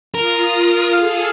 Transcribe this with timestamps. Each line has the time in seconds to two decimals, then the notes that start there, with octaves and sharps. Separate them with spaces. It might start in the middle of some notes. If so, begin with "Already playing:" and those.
0.15 F4 A#4 D#6
0.93 G#4 A4 F5